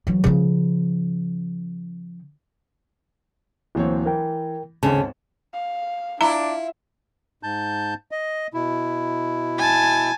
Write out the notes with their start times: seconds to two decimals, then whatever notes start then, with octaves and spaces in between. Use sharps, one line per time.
0.07 E3 F#3
0.24 C#3 F3
3.75 D1 E3 A#3 C4 E4 C#5
4.06 E3 A#4 G5
4.83 G#1 D2 C#3 A5
5.53 F5
6.21 D4 E4 F4 A#5
7.43 G#2 A5 G6
8.11 D#5
8.54 B2 E4
9.58 G#5 A5